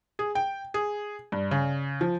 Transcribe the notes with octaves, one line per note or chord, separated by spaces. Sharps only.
G#4
G5
G#4
G2
C#3
F3